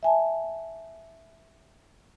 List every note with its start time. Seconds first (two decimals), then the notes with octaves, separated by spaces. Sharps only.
0.03 E5 G#5 A5